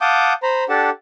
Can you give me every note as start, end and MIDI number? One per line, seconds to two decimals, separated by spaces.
0.01 0.33 77
0.01 0.33 78
0.01 0.33 81
0.01 0.33 86
0.01 0.33 87
0.01 0.33 91
0.43 0.64 72
0.43 0.64 82
0.43 0.64 83
0.69 0.90 62
0.69 0.90 67
0.69 0.90 69
0.69 0.90 78
0.69 0.90 81